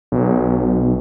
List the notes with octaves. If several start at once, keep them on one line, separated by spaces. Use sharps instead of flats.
B1